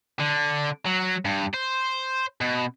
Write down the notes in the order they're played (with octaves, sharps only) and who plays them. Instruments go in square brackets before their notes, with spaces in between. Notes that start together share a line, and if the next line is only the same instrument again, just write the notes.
[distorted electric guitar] D3
F#3
G2
C5
B2